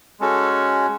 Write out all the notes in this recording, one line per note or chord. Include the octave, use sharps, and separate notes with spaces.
G#3 C#4 F#4 A4